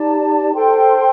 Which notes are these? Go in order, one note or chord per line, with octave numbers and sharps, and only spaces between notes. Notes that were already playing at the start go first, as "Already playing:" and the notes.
Already playing: D#4 G4 D5 A5
A4 C5 G5 C6